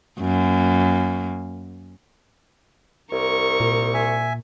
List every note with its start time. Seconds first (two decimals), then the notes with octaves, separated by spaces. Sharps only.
0.20 F#2 A#3
3.12 C2 A#4 C#6
3.60 A#2
3.94 E5 G#5